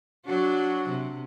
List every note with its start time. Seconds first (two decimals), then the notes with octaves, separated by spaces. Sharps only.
0.25 F#3 D4 F#4
0.89 C3